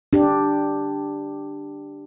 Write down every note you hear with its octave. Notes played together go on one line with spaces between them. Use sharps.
D4 G4